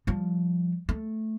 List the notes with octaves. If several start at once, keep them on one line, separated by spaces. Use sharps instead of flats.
F3 G3
A3